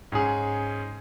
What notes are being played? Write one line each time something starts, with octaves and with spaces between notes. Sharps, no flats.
G#2 C#4 G#4